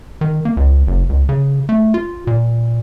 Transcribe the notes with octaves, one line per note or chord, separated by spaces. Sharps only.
D#3
A#3
C#2
F#1
C#2
C#3
A3
F4
A#2